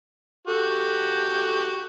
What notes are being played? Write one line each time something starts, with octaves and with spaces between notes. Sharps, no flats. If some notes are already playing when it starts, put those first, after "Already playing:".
F#4 G4 A4